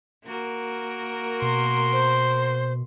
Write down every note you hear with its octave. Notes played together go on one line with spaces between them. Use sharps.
A#3 F#4 A#4
B2 C6
C5